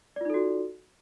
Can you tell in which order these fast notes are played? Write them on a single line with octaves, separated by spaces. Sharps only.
D5 F4 D#4 A4 F#4